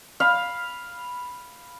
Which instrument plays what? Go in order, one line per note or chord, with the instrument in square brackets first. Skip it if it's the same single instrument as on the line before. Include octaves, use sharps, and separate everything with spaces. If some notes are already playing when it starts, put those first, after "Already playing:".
[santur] F5 B5